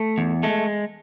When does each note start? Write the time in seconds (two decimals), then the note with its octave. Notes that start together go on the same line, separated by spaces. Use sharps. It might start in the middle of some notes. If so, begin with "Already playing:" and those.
Already playing: A3
0.18 E2
0.43 G#3 A3